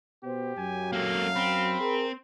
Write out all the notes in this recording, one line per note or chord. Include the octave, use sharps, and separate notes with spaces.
B2 B3 G4 C5
F#2 F#3 G#5
A#3 A4 F5
C4 B5
G#4 A#4